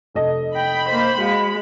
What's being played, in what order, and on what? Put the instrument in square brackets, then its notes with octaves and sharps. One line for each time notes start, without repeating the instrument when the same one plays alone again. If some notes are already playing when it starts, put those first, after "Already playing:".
[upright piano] F1 A4 D#5
[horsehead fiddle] G5 [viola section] B5
[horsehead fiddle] A#3 C5
[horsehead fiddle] G#3 [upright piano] F#4 F5